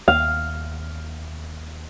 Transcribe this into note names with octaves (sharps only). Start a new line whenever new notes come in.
D#2 F5